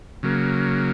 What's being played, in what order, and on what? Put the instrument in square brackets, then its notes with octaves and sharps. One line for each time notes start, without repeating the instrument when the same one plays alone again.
[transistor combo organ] C#3 F#3 A#3